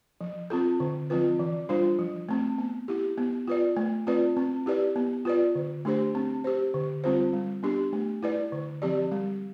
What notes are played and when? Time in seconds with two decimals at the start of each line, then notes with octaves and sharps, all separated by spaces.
0.21 F3
0.50 C4 F4 A4
0.80 D3
1.10 F3 C4 F4 B4
1.39 E3
1.69 G3 D4 F4 C5
1.99 F3
2.29 A3 C4
2.58 B3
2.88 E4 G4
3.18 B3
3.48 F4 B4 D5
3.77 A3
4.07 C4 F4 B4 D5
4.37 C4
4.66 E4 G4 B4 D5
4.96 B3
5.25 F4 B4 D5
5.55 D3
5.85 A3 D4 G4 C5
6.15 C4
6.44 G4 C5
6.74 D3
7.04 G3 C4 F4 C5
7.33 G3
7.63 B3 D4 G4
7.93 A3
8.23 E4 B4 D5
8.52 D3
8.82 F3 C4 G4 D5
9.12 G3